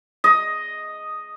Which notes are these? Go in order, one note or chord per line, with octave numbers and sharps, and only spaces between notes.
D#5